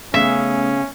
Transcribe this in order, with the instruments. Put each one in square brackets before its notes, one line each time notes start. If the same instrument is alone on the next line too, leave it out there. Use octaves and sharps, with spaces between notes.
[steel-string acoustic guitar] C#3 [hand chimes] A3 B3 [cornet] C#4 [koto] E5